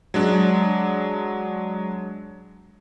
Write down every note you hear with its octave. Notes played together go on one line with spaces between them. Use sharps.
F#3 G#3 D4